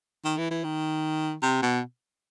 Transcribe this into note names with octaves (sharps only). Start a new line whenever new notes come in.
D#3
E3
E3
D#3
C3
B2